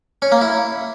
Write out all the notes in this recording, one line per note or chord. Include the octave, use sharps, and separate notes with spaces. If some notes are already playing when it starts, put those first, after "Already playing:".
C#4
A#3
E4